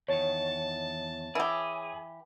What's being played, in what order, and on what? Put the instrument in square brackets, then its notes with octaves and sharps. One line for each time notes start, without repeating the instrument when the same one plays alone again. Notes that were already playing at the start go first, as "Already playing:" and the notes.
[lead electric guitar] E2 D#3 [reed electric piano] C#5 [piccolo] A5
[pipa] E3 G4 [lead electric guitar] G#4